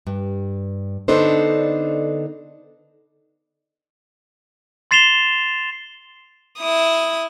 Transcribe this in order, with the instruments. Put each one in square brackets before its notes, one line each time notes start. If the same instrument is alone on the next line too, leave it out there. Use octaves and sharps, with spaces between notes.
[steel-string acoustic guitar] G2
D3 B3 D4 D#4 A4 C5
[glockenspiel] C6 A6 C7 E7 F7 G7
[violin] E4 D#6